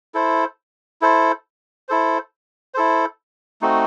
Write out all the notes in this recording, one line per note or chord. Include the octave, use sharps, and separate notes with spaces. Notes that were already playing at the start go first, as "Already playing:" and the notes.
E4 A4 C5
E4 A4 C5
E4 A4 C5
E4 A4 C5
A3 C4 D#4 F#4